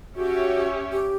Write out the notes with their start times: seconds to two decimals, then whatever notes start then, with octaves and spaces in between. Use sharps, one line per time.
0.16 C#4 F#4 G4 C#5 E5
0.92 G4